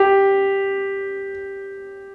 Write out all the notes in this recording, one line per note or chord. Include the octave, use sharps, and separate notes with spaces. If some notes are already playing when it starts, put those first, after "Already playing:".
Already playing: G4